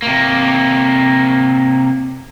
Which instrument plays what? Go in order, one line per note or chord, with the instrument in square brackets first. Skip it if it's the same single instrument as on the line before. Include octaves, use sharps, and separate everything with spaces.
[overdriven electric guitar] C3 A#3